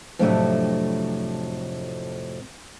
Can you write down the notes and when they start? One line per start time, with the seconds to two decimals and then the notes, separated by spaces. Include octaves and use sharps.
0.19 F2 A2 C3 F#3 A3 D4